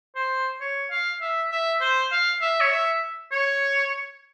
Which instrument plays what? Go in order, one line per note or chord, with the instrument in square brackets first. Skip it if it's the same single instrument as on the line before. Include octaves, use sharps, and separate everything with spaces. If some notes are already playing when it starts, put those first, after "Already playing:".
[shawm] C5
C#5
F5
E5
E5
C5
F5
E5
C#5
E5
C#5